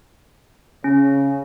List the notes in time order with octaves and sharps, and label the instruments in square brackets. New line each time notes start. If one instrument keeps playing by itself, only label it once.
[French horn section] C#3 [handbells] C#4